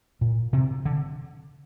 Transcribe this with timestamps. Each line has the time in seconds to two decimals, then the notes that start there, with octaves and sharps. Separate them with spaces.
0.21 A#2
0.53 C3
0.85 D3